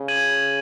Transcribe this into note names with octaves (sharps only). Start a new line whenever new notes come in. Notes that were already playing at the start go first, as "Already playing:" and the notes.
Already playing: C#3
G#6 D#7 F#7